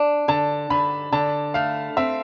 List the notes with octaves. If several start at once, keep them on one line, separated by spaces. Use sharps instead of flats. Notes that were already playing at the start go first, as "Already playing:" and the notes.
Already playing: D4
D3 A5
D3 B5
D3 A5
A3 F5
C4 E5